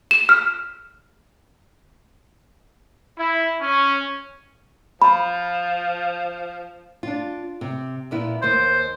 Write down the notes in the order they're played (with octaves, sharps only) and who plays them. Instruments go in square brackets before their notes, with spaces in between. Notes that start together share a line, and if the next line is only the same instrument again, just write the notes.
[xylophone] E7
F6
[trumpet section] E4
C#4
[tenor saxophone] F3 [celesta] B5
[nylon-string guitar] D4 F4
C3
A#2 B3 E4
[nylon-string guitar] D#2 A#3 [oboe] C5